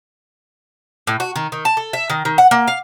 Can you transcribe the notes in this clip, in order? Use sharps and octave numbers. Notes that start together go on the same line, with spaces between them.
A2
F#4
D#3
D#3
A5
A4
E5
D#3
D#3
F#5
A#3
F5